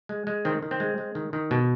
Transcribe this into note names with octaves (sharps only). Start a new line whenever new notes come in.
G#3
G#3
D#3 C4
D#3
C4
G#3
G#3
D#3
D#3
B2